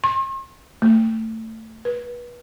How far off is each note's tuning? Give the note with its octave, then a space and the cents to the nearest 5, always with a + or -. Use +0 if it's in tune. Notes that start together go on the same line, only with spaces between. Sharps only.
C6 +45
A3 +20
B4 -30